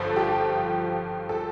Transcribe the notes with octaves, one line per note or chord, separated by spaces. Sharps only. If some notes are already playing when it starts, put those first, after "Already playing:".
Already playing: G1 G2 F3 A4
G4
A4